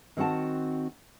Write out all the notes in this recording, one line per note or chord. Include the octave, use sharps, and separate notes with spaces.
D#3 C4 F#4 F#5 A5